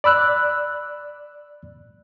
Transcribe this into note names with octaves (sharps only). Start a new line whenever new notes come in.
D5 B5 E6 F#6